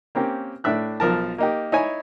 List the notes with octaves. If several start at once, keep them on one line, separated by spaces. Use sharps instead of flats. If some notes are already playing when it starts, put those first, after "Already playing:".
A#3 C4 C#4 G4
A2 D4 E5 F#6
B1 F3 A#4 A5
A#3 D#4 G4
D#4 E4 C#5 G#5